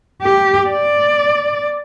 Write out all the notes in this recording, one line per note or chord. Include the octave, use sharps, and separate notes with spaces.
G4
D5